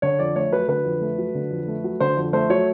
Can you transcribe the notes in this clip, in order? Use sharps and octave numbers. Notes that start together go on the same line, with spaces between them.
D3 C#5
F2 D5
A3 C#5
F#3 B4
D3 B4
F2
A3
F#3
D3
F2
A3
F#3
D3 C5
F2
A3 C5
F#3 C#5